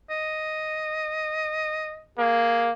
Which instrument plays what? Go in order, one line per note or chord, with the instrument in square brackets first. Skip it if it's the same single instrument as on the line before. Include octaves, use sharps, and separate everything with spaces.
[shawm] D#5
[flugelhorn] A#3 [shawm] G#4